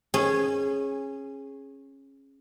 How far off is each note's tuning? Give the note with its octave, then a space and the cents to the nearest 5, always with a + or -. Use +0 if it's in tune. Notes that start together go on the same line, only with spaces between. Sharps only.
C#4 -20 G#4 +0